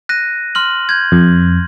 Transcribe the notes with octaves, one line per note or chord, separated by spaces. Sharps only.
F#6 A#6 D#7
C6 F6 F#7
G6 G#6
F2